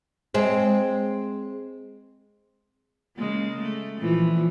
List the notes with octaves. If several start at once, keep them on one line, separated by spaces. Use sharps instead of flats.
G#3 C4
C#3 G#3 A#3
A3
A#2 E3 F3